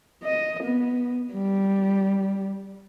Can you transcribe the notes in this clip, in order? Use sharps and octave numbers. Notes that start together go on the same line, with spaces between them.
D#5
B3
G3